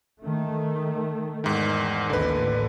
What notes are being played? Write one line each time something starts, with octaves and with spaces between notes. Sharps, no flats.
D#3 A3
E2 G#2 D#3
A1 D#2 D3 B4